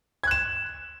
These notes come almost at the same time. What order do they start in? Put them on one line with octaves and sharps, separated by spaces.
G#6 F#6 E7